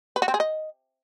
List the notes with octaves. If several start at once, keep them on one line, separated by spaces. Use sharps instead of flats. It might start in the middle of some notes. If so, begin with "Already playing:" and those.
B4
F#4
C4
G#4
D#5